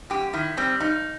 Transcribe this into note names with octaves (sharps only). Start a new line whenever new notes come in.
F#2 G4
D#3 E4
G3 C4
G2 D#4